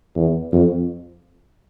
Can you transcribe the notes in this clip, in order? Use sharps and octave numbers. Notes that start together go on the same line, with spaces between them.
E2
F2